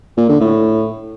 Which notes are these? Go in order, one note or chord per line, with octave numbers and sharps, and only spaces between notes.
A#2
D3
A2